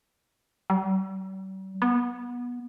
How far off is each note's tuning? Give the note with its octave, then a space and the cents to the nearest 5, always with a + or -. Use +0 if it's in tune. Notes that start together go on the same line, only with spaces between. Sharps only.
G3 -45
B3 -20